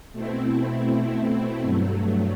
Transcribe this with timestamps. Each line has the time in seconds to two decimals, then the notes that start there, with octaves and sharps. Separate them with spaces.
0.13 B2 A3 C4 E4
1.63 G2 F#3 A3